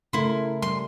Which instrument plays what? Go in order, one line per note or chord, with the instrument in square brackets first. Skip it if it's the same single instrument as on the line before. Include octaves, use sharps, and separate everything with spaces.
[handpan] C#3 A3 A#4 [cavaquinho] E4 C6
[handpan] G3 [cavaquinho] C6